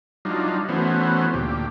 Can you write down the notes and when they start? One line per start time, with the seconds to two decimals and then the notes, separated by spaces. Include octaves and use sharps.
0.25 F#3 G3 D4 D#4 F4
0.69 E3 A3 B3 C#4 F#4 C5
1.34 D2 A#2 G4